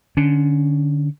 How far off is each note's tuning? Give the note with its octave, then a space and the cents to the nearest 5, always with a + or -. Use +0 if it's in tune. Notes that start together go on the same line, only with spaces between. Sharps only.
D3 +15 C#4 +25